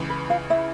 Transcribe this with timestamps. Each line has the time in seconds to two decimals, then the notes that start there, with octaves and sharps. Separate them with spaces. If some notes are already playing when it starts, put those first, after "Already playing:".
Already playing: C#2 C#3 E3
0.10 B4
0.30 F4 F5
0.50 E4 E5